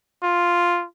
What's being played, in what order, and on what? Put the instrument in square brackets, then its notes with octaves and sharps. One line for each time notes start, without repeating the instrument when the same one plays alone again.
[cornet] F4